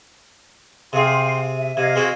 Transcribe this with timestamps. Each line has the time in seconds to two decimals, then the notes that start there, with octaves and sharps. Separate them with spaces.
0.93 C3 G#4 F5 G5 C6
1.57 E5
1.77 C3 D#5 F5 G#6
1.95 G#3 C4 F#4